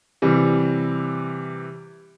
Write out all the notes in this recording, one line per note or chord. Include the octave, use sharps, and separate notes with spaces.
C3 E3 G3